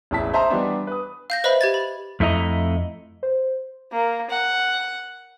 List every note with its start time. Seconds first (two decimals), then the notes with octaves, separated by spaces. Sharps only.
0.11 E1 A1 E4 A5 B6
0.34 C5 D#5 E5 A5 A#5 C6
0.50 E3 G3 B3 D4
0.87 B4 D#6
1.30 F5 G6 A#6
1.44 B4 C5 D#5 E5 B5
1.61 G4 G#6 A6
1.74 B5
2.20 F2 A3 E4 D#5 A#5
3.23 C5
3.92 A#3
4.30 F#5